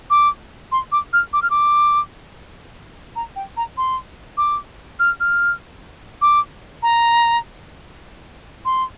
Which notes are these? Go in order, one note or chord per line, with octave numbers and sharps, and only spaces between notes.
D6
C6
D6
F6
D6
F6
D6
A#5
G5
A#5
C6
D6
F6
F6
D6
A#5
C6